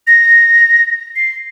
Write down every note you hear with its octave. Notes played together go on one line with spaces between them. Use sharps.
A#6
C7